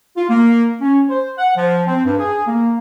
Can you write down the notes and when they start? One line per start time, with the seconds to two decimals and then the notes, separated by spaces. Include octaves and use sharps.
0.16 F4
0.29 A#3
0.80 C#4
1.09 C5
1.38 F#5
1.56 F3
1.87 C4
2.04 G2
2.18 G#4
2.46 A#3